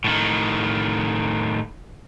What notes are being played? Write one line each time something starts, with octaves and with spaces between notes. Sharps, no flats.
A2 D#3